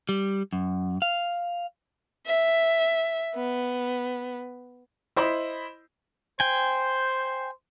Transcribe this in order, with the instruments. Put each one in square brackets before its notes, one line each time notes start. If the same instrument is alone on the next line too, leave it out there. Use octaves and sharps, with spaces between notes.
[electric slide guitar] G3
F#2
F5
[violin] E5
B3
[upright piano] E4 C5 D#5 B5
[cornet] C5 [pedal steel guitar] G5 G#5